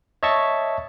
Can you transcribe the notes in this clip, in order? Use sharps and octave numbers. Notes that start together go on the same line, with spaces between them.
C#5 D#5 E5 A5 C#6